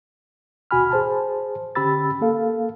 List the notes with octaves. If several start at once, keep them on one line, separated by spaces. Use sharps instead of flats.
D2 B2 F#4 G#5 B5 F6
G#4 C5 A5
D3 C#4 G4 B5 E6 A6
A#3 A4 F5